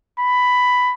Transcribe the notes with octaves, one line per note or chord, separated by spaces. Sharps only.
B5